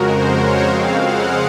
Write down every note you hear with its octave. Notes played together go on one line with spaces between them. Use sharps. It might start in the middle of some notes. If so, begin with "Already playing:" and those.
Already playing: F2 C#3 G#3 F#4 A#4
C5
C#5
F2 C#3 G#3 C4 F5
F#5